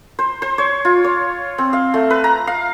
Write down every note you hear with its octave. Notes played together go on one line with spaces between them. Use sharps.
C5
C5
C#5
F4
C#5
C4
F5
A3
B4
A#5
F5